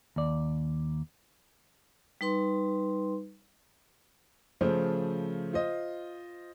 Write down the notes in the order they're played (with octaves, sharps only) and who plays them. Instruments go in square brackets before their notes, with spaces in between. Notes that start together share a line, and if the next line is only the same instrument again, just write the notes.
[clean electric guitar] D#2 D5
[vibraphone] G3 D#4 B4 C6
[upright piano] C#3 F3 A3 C5
F4 C5 D#5